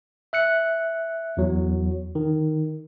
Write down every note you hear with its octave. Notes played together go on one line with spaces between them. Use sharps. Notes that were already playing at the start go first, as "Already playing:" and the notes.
E5 F#6 C#7
E2 F#3
D#3